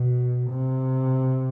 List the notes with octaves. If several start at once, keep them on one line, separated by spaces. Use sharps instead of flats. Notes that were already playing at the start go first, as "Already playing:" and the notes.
Already playing: B2
C3